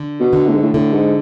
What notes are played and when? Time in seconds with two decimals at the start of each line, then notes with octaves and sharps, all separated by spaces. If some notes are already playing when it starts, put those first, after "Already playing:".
Already playing: D3
0.20 B2
0.33 D3
0.47 A2
0.55 G#2
0.62 A2
0.74 A2 D3
0.93 G#2